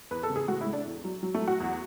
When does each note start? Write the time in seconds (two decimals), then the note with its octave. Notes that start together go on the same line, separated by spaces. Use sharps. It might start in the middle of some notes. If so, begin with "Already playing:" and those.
0.11 E2 B4
0.23 A4
0.30 C#3
0.36 G#4
0.48 A2 F#4
0.61 E4
0.66 A2
0.73 D4
0.85 E2
1.04 F#3
1.23 F#3
1.35 A3
1.41 F#3
1.48 F#4
1.60 E2